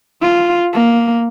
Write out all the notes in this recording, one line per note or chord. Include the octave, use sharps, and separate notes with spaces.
F4
A#3